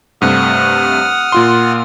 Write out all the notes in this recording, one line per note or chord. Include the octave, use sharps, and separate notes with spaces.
G2 C3 A3 F#5 D#6 F6
A#2 F4 C6